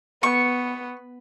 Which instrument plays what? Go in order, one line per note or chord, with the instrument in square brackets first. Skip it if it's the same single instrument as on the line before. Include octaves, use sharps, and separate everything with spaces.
[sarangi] B3 [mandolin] C#6